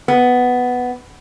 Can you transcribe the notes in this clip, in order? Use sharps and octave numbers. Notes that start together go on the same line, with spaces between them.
B3